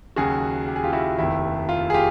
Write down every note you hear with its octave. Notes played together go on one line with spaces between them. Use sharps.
D#2 C#3 F#3 F#4 G#4
G4
G#4
F4 G4
E4 F#4
F1 D#2 D#3 E4
F4
G#4
F4 G4